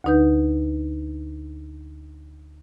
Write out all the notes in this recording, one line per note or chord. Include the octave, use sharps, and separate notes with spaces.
D2 D3 D#4 B4 G6